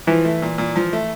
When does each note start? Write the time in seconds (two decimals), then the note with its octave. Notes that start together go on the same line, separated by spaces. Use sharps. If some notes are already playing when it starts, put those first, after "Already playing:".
0.07 E3 F3
0.25 A3
0.42 A#2
0.58 A#2
0.76 F3
0.93 A3